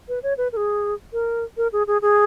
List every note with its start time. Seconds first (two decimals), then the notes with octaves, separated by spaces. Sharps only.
0.09 B4
0.23 C#5
0.38 B4
0.52 A#4
0.57 G#4
1.13 A#4
1.57 A#4
1.73 G#4
1.87 G#4
2.02 G#4